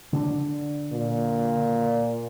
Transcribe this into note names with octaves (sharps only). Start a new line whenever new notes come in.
D3 C#4 D4
A#2